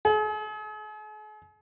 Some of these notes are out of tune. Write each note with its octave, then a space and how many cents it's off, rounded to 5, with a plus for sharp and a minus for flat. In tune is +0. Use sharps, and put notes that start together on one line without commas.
G#4 +45